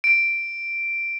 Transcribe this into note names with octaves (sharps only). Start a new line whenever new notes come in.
D7